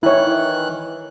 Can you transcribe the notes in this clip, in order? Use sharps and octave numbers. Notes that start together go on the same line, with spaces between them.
D#3 E3 E4 C#5 F#6